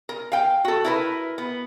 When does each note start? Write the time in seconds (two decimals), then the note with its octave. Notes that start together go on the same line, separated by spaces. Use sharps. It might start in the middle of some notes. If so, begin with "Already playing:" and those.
0.09 A#4
0.32 F5 G5
0.65 F#4 A4
0.85 E4 A#4 B4
1.38 B3